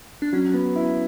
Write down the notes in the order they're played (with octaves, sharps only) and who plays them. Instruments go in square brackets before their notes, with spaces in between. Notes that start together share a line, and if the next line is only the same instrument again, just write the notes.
[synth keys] D4
[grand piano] F#3 [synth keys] C#4
[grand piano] B3
E4